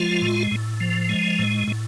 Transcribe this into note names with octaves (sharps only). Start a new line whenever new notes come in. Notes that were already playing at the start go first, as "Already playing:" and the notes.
Already playing: F3 G#3 F4
A2
A2
F3
G#3
A2
A2